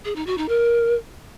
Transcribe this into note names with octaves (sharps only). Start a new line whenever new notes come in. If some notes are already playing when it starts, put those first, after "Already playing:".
G#4
D#4
F#4
D#4
A#4